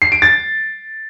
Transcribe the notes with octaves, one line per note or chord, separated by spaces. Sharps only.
C7
D7
A6